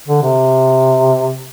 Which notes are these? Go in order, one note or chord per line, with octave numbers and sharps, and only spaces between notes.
D3
C3